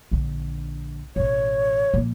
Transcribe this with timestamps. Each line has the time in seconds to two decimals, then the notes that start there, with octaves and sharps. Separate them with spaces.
0.11 A#1 D3
1.16 A1 B2 C#5
1.94 A#2 F3